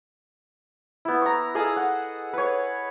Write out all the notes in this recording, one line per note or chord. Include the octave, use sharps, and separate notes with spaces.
B3 E4
A#5 C#6
G#4 A4 D#5 F5
F#5
B4 C#5